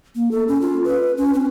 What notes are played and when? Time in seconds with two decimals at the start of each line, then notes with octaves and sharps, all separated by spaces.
0.15 A#3
0.31 A4
0.48 C#4
0.61 F4
0.84 B4
1.17 C#4
1.34 C4